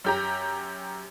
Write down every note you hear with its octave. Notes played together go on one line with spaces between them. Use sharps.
F#2 G4 A#5